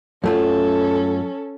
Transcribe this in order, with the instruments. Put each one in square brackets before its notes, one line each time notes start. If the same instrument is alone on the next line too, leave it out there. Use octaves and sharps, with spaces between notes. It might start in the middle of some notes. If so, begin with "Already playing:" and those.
[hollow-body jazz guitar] F#2 A3 F4 [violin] C#4 A4